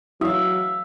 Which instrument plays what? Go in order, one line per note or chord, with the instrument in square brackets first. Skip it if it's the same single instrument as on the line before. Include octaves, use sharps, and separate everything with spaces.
[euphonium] F#3 [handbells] E4 F#4 D#6 [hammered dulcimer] E5 F5